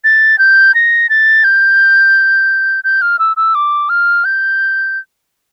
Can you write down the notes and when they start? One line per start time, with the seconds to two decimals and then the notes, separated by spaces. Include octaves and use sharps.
0.04 A6
0.39 G6
0.75 A#6
1.10 A6
1.44 G6
2.84 G6
3.02 F6
3.19 E6
3.37 E6
3.55 D6
3.89 F6
4.25 G6